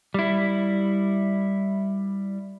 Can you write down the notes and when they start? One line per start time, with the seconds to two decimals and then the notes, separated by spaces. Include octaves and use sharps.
0.14 G3 E4